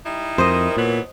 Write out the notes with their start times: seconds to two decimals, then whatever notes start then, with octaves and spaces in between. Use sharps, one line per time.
0.06 G3 D#4 E4
0.38 F2 A#4 C5 D#5
0.77 A#2 E3 F#3 B3